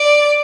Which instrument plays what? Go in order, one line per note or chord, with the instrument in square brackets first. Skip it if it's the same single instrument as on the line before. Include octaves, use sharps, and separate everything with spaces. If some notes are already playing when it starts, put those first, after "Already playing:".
Already playing: [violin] D5